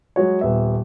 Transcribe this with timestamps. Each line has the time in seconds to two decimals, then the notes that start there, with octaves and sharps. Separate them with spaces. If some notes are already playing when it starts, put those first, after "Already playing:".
0.16 F#3 G#3 F#4 C#5
0.41 D#1 B3 E5